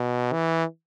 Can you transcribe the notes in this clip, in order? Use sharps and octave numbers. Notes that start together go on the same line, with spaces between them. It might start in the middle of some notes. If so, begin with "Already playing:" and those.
Already playing: B2
E3